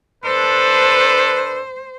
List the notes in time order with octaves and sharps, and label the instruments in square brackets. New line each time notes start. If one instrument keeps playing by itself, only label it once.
[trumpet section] D4 A4 B4 [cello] C5